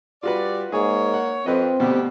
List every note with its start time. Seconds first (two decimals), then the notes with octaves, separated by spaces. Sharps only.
0.23 G3 F4 F#4 B4 D5
0.72 G#2 A#3 G#4 C#5
1.14 F#5
1.46 F2 C4 F4 B4 D#5
1.80 D2 B2 G4